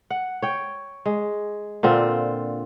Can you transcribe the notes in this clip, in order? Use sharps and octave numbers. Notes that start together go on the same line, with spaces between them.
F#5
C#5 G5
G#3
A#2 D3 C4 F4